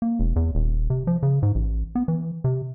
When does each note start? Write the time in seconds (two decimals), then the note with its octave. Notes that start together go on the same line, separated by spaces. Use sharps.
0.02 A#3
0.20 E1
0.36 E2
0.55 D#1
0.90 C3
1.07 F3
1.23 C#3
1.43 G#2
1.55 A1
1.95 B3
2.08 E3
2.44 C3